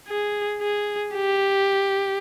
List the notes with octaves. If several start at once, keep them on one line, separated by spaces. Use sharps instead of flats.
G#4
G#4
G4